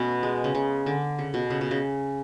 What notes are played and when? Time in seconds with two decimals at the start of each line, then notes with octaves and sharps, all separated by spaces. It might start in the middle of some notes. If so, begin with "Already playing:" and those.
Already playing: B2 A3 B3 C#4
0.23 G#3
0.44 C#3
0.55 C#3
0.86 D3
1.19 C#3
1.34 B2
1.50 C#3
1.61 B2
1.71 C#3